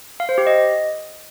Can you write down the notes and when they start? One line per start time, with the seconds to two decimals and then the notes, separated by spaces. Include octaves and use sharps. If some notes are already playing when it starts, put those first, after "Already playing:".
0.20 F5
0.29 C5
0.38 G4
0.47 D#5